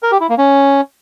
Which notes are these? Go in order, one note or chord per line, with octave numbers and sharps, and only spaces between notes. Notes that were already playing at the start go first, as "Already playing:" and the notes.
A#4
G4
E4
A#3
C#4